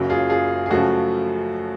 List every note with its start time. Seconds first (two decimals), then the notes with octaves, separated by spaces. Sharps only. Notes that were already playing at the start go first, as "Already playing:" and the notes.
Already playing: F#1 F#2 C#3 F#3
0.09 F4 G#4
0.29 F4 G#4
0.66 G#4
0.70 F#2 C#3 F3 A3 F#4